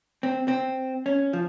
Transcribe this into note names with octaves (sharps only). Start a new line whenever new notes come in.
C4
C4
C#4
F3